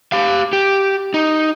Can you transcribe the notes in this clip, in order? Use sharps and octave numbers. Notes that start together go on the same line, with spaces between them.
G4 F5
G4
D#4